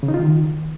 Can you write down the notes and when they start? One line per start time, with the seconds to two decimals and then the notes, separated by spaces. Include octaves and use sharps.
0.03 C#3
0.08 D#4
0.14 F4
0.20 D#3